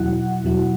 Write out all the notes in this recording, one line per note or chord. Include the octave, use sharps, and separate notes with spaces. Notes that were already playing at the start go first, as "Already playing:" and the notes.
Already playing: E2 B2 F#3 E4 F#5
E2 B2 F#3 E4